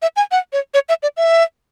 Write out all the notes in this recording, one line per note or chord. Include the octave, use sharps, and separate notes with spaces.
E5
G#5
F#5
C#5
C#5
E5
D5
E5